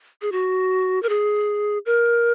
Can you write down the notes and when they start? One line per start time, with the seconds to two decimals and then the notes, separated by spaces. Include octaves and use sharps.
0.22 G#4
0.32 F#4
1.03 A#4
1.09 G#4
1.86 A#4